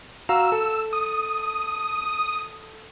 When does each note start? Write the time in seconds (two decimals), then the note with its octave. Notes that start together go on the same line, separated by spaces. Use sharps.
0.29 F#4 F5 A#5 E6
0.52 A4
0.93 D#6